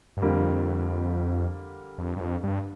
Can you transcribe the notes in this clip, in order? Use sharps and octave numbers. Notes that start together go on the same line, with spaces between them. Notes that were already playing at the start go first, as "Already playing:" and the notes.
G2
F2 D3 G3 A#3
F2
G2
F2
G2